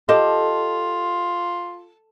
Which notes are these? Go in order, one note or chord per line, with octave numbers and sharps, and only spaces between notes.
F4 G4 A4 D#5